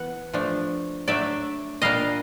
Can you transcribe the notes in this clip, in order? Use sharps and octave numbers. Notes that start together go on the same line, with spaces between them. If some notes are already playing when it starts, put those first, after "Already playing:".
Already playing: E3 B3 F#5
F3 A3 D4
F#3 A3 D4 D5 E5
A#2 G3 A#3 D4 D#5 F5